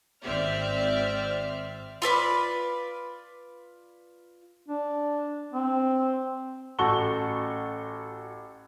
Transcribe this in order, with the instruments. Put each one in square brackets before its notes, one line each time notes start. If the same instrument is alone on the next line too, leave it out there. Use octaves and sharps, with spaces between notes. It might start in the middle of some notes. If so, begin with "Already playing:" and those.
[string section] G#1 C4 D5 E5 F6
[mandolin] F4 A4 B4 D5
[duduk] D4
C4
[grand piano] A1 F#4 A4 C#6 G7